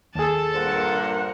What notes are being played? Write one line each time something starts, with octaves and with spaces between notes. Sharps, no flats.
D#2 G#4 A4 A5
G2 A#2 A#4 C5 F#5